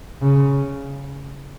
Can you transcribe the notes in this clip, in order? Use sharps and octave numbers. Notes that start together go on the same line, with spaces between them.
C#3